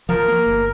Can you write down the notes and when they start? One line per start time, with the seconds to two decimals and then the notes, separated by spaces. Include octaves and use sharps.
0.09 F3 A#4
0.28 A#3
0.46 G1